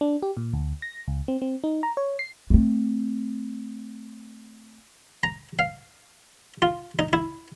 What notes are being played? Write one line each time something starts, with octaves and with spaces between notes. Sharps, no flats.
D4
G4
A#2
D2
A#6
C#2
C4
C4
D#4
A#5
C#5
C7
A3 C4
A#5
F5
F4
D#4
E4